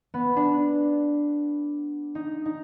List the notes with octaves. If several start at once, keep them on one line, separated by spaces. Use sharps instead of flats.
B3
D4
D#4
D#4